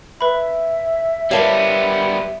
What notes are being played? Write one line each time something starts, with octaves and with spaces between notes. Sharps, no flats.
B4 E5 B5
G3 B3 G4 A#4 C#5 D5 F5 A5